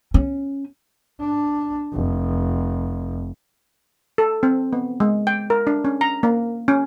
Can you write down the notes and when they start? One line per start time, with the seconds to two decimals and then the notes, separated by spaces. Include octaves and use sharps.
0.14 C#4
1.20 D4
1.94 F1
4.18 A4
4.43 C4
4.73 B3
5.00 G#3
5.27 G5
5.50 A#4
5.67 D4
5.85 C#4
6.01 A#5
6.23 A#3
6.68 C#4